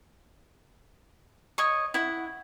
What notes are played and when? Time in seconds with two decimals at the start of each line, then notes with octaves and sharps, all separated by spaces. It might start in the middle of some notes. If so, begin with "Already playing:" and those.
1.58 C#5 D#5 C#6
1.94 E4 F#5